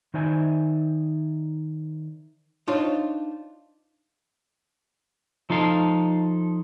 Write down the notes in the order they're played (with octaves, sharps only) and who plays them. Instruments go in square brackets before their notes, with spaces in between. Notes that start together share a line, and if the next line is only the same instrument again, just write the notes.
[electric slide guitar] D#3 D#4 C5 D5 E5 G#5
[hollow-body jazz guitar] D4 D#4 F4 C5 C#5 D#5
[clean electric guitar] F3 D#4 A4 F5